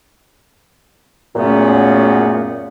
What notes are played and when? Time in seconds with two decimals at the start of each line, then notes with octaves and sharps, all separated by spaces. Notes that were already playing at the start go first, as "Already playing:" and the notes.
1.36 F#2 A#2 C#3 A3 B3 C#4